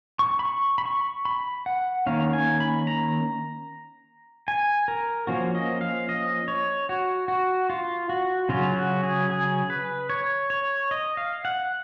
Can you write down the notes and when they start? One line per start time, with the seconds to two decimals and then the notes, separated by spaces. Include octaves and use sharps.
0.19 C#6
0.39 B5
0.45 C#6
0.78 B5
0.85 C#6
1.25 B5
1.66 F#5
2.06 D#3 A#3 C#4 F5
2.33 G#5
2.60 B5
2.87 A#5
4.48 G#5
4.88 A#4
5.27 F3 A#3 C#4 F#4
5.55 D#5
5.81 F5
6.09 D#5
6.48 C#5
6.89 F#4
7.28 F#4
7.70 F4
8.10 F#4
8.49 C#3 F#3 C#4 F4
8.76 F#4
9.03 G#4
9.30 G#4
9.70 B4
10.10 C#5
10.50 C#5
10.91 D#5
11.17 F5
11.45 F#5